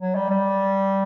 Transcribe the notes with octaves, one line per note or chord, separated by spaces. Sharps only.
F#3
G3
G3